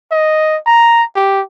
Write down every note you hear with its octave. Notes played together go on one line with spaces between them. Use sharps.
D#5
A#5
G4